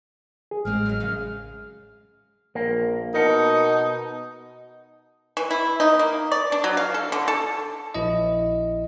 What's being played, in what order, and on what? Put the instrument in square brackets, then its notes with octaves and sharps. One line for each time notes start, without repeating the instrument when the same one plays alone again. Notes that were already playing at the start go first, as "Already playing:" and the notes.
[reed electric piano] G#4
[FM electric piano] A1 [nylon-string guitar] G3 G#3 C4 [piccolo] F6
[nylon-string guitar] F#3 D#5
F#2 C#3
[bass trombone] A#1 [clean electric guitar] A#3
[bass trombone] B2 [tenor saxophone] D#4 [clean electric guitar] A#4 F#5 A5
[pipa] E3
E4
D#4
A#3
D5
D4
F#3
F5
A4
D3
A4
[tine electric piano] A#1 E4 D#5